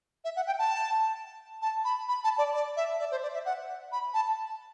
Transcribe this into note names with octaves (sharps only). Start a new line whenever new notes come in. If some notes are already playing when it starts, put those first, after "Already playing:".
E5
F#5
G5
A5
A5
B5
B5
A5
D5
D5
E5
D5
C5
D5
E5
F#5
B5
A5